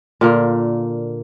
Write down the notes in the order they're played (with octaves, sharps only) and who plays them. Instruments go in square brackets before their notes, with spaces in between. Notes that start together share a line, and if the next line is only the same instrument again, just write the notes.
[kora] A#2 D3 A#3